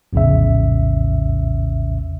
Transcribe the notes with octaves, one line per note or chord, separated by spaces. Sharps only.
A#1 E2 A2 C#3 E5